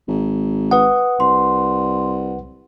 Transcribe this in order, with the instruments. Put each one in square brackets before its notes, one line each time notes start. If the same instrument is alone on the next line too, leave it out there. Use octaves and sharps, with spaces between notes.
[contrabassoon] G#1
[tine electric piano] B4 F#5 [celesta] D#6
[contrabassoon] C2 [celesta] C6